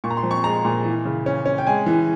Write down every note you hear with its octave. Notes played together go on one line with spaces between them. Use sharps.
A#2 C#6
A#5
C6
F3
C#6
G#3 A#5
A#2
E3
C#3
C#4
C#4
G5
G#3 G#5
E3